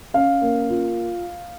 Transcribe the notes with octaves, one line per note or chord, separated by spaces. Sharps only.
C#4 F5
A#3
F4